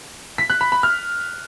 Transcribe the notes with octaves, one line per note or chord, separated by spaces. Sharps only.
B6
F#6
B5
B5
F6